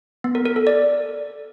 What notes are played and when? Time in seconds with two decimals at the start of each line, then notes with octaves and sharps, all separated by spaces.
0.24 B3
0.35 A#4
0.45 A#4
0.56 A4
0.67 D5